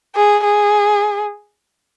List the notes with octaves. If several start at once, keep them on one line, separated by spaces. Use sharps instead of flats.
G#4
G#4